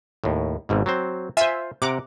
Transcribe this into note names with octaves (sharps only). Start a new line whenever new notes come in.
D#2 A2
G#1 G#2 B2
F#3 C4 C5
F4 C5 E5 G#5
C3 F#5 A#5 D6